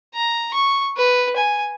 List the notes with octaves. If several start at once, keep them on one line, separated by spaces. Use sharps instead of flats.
A#5
C#6
B4
G#5